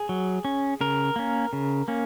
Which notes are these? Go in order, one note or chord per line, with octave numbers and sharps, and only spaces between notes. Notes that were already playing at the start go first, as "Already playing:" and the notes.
Already playing: G#4
F#3
C#4
C#3 A#4
A#3 C#4
C#3
A#3 C#4